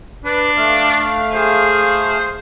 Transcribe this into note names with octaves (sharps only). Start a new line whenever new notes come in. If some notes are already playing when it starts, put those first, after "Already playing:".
D4 B4
A3 F5
G#4 C5